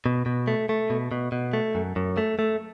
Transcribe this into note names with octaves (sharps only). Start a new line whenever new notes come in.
B2
B2
A3
A3
B2
B2
B2
A3
F#2
F#2
A3
A3